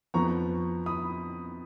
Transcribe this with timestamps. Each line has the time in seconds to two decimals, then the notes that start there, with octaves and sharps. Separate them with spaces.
0.14 F2 F3 B3 A#5 C#6
0.86 B5 D#6